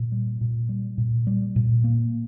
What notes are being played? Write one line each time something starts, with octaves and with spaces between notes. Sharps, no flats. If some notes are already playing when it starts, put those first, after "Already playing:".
Already playing: A#2
G3
A#2
G3
A#2
G3
A#2
A#3